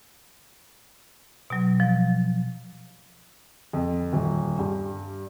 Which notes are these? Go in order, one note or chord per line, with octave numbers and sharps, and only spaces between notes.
B2 F#3
F3
F2
D#1
G2